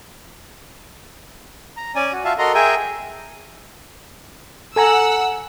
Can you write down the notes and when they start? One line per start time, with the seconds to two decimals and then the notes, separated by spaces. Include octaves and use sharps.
1.77 A#5
1.95 C#4 D5 G#5
2.12 F#4
2.25 F4 F#4 E5 F5 A5
2.38 F#4 A4 A#4 D#5 A#5 C6
2.55 G#4 A#4 E5 G5 G#5
4.76 A4 F#5 G#5 A#5 E6